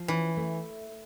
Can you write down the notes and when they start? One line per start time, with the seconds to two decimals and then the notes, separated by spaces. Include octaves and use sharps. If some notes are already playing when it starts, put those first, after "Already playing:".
Already playing: F3
0.08 E3 C#4
0.37 A3